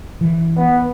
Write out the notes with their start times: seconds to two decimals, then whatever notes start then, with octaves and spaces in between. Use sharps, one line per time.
0.21 E3
0.57 B3